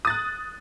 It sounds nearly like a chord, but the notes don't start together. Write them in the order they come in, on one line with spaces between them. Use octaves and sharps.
D#6 A6 F#6